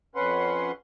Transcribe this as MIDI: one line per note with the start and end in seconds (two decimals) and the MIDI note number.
0.15 0.72 41
0.15 0.72 61
0.15 0.72 71
0.15 0.72 78
0.15 0.72 84